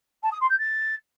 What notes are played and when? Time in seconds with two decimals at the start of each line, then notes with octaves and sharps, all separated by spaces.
0.23 A5
0.32 D#6
0.41 C6
0.49 G6
0.58 A6